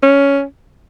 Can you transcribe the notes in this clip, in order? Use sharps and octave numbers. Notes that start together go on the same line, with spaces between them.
C#4